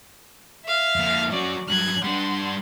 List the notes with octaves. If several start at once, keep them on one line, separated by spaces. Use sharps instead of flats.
E5 F5
F2 A#3
F#3 C#4 F#4 D5
G2 F#3 F#6 G#6
G3 D4 F#5 C6